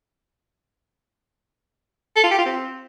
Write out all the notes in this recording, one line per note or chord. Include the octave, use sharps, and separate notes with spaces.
A4
F4
G4
F4
C4